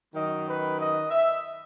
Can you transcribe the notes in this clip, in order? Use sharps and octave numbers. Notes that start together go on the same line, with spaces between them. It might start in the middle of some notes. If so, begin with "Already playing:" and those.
F#2 D#3 F#3 D#5
B4
D#5
E5